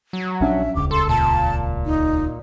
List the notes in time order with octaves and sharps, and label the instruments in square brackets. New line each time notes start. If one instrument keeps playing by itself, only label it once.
[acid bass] F#3
[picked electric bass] A#1 C#4 D4 [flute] E5
[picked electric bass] D#1 C#2 [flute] D6
[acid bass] A4 [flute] C6
[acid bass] A#2 [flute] A5
[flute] D#4